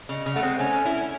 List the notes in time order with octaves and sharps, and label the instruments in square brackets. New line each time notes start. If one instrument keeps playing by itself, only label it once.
[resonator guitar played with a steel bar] C#3 [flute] D#5
[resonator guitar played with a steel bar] C#3
[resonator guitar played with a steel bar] A3 [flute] F#5
[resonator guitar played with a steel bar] G#3 C4
[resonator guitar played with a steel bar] A3 C#4 [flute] G#5
[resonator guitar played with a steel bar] C#4 E4